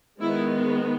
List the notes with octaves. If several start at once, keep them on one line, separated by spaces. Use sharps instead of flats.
D#3 G#3 B3 E4